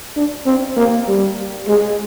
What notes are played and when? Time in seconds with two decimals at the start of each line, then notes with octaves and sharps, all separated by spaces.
0.17 D4
0.46 C4
0.77 A#3
1.07 G3
1.68 G#3